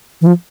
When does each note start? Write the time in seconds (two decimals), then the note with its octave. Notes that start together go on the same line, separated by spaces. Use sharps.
0.21 E3
0.27 F3